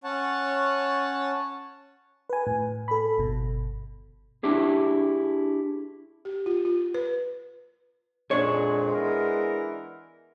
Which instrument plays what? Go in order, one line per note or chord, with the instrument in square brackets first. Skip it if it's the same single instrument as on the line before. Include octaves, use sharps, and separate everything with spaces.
[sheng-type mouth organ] C#4 C#5 F#5 A5
[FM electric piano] B4 G#5
A2
A4 B5
G1 B2
[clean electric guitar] D4 E4 G4 G#4
[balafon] G4
F4
F4
B4
[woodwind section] F2 A#2 [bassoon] G#3 [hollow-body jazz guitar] D4 C#5
[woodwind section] E3 B3 A#4